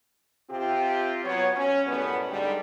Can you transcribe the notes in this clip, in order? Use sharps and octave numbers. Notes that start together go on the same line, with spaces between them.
C3 C4 F4 G4
F#3 B3 C#5
C#4
F#2 A2 G3 B3
G#2 D3 G3